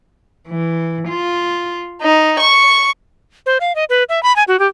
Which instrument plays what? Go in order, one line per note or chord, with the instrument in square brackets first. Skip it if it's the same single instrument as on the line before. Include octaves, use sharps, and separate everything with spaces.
[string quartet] E3
F4
D#4
C#6
[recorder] C5
F5
D#5
B4
E5
B5
G#5
F#4
G4